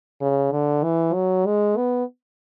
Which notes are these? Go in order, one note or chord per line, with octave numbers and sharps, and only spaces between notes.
C#3
D3
E3
F#3
G#3
B3